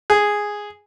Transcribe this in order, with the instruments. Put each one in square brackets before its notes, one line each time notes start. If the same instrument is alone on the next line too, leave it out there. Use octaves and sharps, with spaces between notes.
[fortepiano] G#4